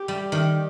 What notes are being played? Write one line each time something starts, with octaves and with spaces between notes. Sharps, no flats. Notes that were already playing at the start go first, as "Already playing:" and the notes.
Already playing: G4
G3
D#3